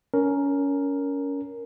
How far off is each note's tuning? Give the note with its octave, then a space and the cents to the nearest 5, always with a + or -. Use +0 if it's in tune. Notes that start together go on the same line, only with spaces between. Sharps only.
C#4 +20 A#4 +0